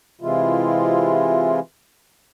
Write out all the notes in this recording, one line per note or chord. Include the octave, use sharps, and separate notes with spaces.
C3 E3 G#3 E4 F4